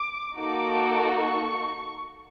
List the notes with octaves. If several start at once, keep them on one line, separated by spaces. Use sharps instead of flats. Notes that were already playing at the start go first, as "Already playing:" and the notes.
Already playing: D6
A#3 D#4 F#4 A4 D6
C#6